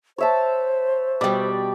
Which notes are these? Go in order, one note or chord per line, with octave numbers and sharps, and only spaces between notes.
C5 C#5 E5 A5
B2 G3 D5 G5